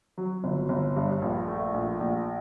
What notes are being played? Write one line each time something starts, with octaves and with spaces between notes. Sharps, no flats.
F#3
G1
G1
G2
A#1
A3
A#1
A#1